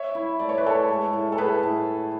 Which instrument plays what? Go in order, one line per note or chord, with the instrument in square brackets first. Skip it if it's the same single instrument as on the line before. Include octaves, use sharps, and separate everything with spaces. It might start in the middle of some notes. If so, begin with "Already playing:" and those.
Already playing: [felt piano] C#5 E5
[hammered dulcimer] E4
[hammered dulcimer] A3 [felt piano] D5
[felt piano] C#5
B4
[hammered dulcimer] A3 [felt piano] A4 C#5
[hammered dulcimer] G#3
A2
[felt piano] A4
[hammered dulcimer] A2 [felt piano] G#4 B4
[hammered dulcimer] A2